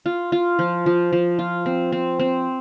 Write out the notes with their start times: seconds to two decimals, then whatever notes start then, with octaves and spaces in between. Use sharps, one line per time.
0.06 F4
0.32 F4
0.59 F3
0.86 F3
1.12 F3
1.39 F4
1.66 C4
1.92 C4
2.19 C4